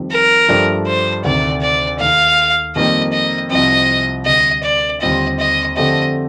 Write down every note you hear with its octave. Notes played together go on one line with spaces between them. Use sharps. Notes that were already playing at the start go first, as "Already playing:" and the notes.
Already playing: F2 D#3 G3
A#4
G2 F3 A3 D4 G4
C5
D2 C3 D#3 A3 D5
D5
D#2 D#3 A3 D#4 F5
F2 D#3 G3 A#3 D#5
D#5
C2 C3 F3 C4 D#5
D2 C3 G3 D#5
D5
D#2 D3 G3 C4 F4 D#5
D#5
F2 D3 A3 C4 G4 D#5